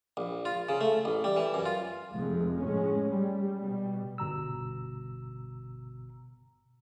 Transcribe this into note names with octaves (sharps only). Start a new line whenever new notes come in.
A#1
F4
C#3
A3
A1
G3
E3
F#2
F4
F1 F2 G#3
A2 G#3 C#4
G3
B2 G3
G1 B2 A#5 E6